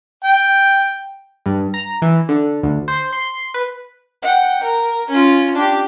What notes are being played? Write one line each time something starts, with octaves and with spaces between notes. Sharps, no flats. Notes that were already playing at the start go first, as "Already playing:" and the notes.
G5
G2
A#5
E3
D3
D2
C5
C6
B4
F#5 G5
A#4
C#4 F4
D4 G4